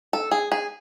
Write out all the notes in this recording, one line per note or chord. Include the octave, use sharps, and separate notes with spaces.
A4
G#4
G#4